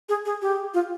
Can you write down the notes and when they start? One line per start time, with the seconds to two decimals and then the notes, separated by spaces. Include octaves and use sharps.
0.09 G#4
0.25 G#4
0.42 G4
0.74 F4